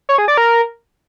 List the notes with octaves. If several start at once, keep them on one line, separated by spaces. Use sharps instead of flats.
C#5
G#4
D5
A#4